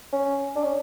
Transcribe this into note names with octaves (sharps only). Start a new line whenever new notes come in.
C#4
D4
C#4